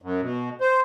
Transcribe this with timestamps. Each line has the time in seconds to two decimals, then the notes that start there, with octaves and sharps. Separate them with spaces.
0.02 F#2
0.21 B2
0.61 C5